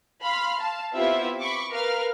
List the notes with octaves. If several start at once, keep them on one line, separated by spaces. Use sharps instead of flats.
F5 B5 C6 F6
F5 A5
B3 C4 E4 F4 G4 E5
B5 C#6 D6
A#4 B4 F5 F6